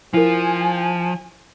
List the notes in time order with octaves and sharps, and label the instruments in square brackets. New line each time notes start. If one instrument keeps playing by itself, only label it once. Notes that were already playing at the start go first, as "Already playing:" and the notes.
[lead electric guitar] F3 [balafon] E4 A#4 [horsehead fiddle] G#5